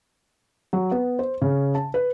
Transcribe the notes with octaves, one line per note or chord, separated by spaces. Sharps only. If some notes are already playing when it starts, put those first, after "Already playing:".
F#3
B3
C5
C#3
A5
B4